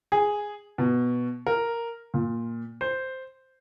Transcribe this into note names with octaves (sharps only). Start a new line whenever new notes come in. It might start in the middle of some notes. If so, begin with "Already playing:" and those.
G#4
B2
A#4
A#2
C5